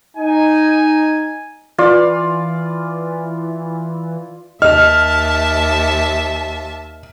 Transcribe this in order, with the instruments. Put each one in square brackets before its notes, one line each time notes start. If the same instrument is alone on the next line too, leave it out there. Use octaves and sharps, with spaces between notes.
[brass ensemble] D#4 G#5
[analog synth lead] E3 [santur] F4 D5
[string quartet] D#2 E5 A5 [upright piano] D#5 [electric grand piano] F6